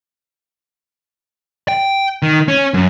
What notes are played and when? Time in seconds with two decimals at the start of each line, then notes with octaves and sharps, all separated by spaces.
1.69 G5
2.23 D#3
2.48 C#4
2.74 F#2